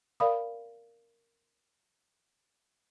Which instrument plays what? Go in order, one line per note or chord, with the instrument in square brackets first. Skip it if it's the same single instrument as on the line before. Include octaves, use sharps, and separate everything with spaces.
[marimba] A#4 D5 F5 B5 D#6